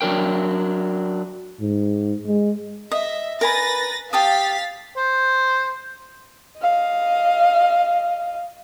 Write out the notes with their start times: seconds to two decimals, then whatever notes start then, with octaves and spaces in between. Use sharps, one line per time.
0.01 F#3 D4 A#4 G5
1.61 G#2
2.26 G#3
2.91 D#5 E5
3.41 A#4 B4 G#5 B5 A6 A#6
4.13 G4 F5 A5 D#6 A6 B6
4.97 C5
6.60 D#5 F5